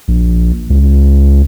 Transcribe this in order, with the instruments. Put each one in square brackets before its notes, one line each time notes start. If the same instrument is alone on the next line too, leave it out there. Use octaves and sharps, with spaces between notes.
[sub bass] A#1
C#2